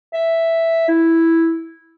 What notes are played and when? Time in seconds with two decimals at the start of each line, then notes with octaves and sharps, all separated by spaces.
0.14 E5
0.88 E4